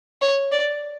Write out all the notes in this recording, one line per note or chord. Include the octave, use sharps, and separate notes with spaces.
C#5
D5